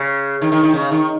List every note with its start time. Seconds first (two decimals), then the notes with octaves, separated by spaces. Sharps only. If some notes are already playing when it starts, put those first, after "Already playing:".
Already playing: C#3
0.42 D#3
0.52 D#3
0.63 D#3
0.74 C#3
0.92 D#3